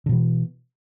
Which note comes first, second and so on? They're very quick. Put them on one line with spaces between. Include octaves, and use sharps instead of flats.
D3 B2 E3